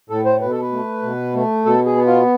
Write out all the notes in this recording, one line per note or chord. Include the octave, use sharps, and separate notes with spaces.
A2 A4
C5
B2 B4
A4
B4
A3
B2
A3
B2 A4
G#4
B3
F4